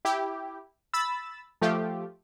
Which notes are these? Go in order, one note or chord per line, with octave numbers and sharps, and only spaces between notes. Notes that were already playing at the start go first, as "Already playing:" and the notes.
E4 G4
B5 E6 A6
F3 A3 F4 G4